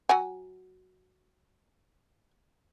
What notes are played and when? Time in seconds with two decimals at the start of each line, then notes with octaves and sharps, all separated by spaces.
0.09 F#3 F#5 G#5